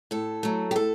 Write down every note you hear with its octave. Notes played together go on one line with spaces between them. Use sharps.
A2 A4
F#3 A3
G4
A2 A4